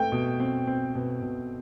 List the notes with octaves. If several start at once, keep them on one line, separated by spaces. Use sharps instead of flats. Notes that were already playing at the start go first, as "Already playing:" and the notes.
Already playing: A3 C4 G5
B2
C4
C4
B2
B2